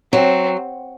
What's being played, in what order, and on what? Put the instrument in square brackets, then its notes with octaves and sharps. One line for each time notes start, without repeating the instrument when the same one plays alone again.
[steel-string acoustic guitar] F#3 [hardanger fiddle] C4